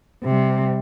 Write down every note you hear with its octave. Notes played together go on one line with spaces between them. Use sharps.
C3 G3